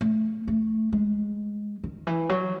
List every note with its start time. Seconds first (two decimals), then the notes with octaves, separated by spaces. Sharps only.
0.01 A3
0.47 A3
0.92 G#3
1.84 D#3
2.07 E3
2.29 F#3